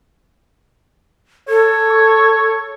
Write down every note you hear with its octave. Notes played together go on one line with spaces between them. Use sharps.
A4 C#5
C#6